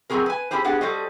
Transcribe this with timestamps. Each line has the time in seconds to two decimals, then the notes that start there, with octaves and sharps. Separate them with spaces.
0.10 F#3 C4 F4 F#4 G#4 A#4
0.26 B4 G#5
0.51 C#4 E4 G4 G#4 C5
0.64 B3 D4 G4 G#4 F#5
0.81 G3 F#4 A4 C5 D#5